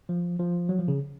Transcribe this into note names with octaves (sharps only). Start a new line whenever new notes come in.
F3
F3
F#3
F3
C#3